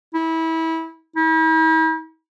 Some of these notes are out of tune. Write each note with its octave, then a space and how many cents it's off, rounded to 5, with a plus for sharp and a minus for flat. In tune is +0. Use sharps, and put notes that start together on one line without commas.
E4 -25
E4 -45